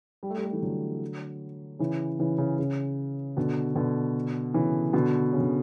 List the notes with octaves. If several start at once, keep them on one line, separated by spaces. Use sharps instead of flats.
G3
A3
G3
A3
E3 G3
D3 F#3
C#3 E3
C#3 E3
C#3
C#3
B2 D3
B2 D3
C#3 E3
B2 D3
C#3
D3